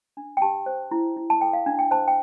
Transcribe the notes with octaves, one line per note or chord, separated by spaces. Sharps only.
D4
G5
G4 A5
C5
E4
E4
A5
A4 G5
F5
D4
G5
C5 A5
G5